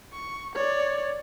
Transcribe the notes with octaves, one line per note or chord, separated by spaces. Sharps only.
C#6
C#5 D5